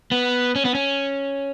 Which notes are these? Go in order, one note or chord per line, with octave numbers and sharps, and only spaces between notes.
B3
C#4
B3
C#4